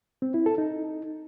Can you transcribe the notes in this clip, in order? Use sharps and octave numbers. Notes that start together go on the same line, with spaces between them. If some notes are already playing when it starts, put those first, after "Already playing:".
C4
E4
A4
D#4